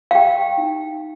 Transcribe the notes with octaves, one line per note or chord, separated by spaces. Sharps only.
F5
G4 G5
D#4